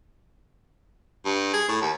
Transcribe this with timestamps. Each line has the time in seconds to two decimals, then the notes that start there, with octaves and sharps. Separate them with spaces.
1.25 G2
1.53 G#4
1.68 A2
1.82 D#2